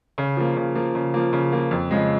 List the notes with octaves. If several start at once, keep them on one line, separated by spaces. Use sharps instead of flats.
C#3
F3 A#3
C#3
F3 A#3
C#3
F3 A#3
C#3
F3 A#3
F2
C#3 F3 G#3